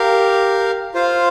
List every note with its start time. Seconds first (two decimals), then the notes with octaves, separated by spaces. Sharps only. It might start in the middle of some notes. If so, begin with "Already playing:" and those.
Already playing: G4 A#4 F5
0.94 F4 C5 F5